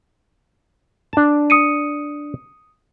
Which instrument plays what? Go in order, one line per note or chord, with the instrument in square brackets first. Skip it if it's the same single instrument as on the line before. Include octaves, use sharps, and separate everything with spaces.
[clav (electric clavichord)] D4 A5
[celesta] D#6 C#7 D#7